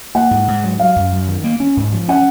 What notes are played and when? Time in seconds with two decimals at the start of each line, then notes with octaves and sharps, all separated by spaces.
0.15 A#3 F#5
0.31 G#2
0.48 G#2
0.64 F#3
0.79 F#3 F5
0.96 F#2
1.12 F#2
1.28 D#3
1.44 A#3
1.60 C#4
1.77 G#2
1.93 F3
2.08 C#4 F#5